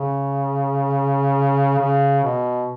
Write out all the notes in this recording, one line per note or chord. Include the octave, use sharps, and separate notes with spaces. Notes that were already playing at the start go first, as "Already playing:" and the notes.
Already playing: C#3
C#3
B2